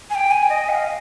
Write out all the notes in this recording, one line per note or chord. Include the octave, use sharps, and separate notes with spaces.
G#5
G5
G#5
D#5
G5
F5